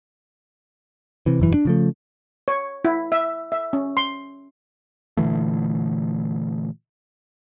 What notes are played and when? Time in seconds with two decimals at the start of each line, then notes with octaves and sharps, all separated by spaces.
1.26 C3 E3
1.40 E1 F#2 E3
1.54 D4
1.65 C#3 F3 A3
2.48 C#5
2.85 E4
3.12 E5
3.52 E5
3.73 C#4
3.97 C6
5.17 A#2 D3 E3 A3